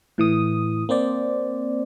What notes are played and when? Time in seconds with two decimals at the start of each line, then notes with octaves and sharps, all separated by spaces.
0.18 A2 E3 D#6
0.89 A#3 C4 C5 D5